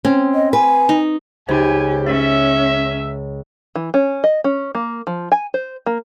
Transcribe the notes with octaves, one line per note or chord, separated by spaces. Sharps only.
C4 C#4
D#5
B4 G#5
D#4
C#2 D#4 G4 C5 G#5
C#4 C#5 E5
E3
C#4
D#5
C#4
A#3
F3
G#5
C5
A#3